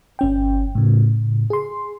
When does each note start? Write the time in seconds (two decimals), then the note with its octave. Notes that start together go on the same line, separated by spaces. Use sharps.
0.19 G1 C#4 G5
0.75 A2 C#3
1.50 G#4 C6